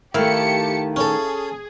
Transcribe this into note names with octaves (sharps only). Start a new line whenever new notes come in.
D#3 A3 E4 G4 F5 A5 C#7
C#4 G#4 A4